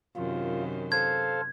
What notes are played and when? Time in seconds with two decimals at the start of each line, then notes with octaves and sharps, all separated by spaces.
0.16 F#2 C3 D#3 F4
0.92 A4 C5 F5 G#6